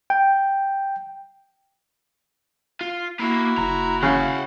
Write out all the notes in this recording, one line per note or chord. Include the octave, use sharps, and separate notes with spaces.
G5
F4
A#3 E4 F#4 A#5
F#1 A#5
C#3 F5 F#5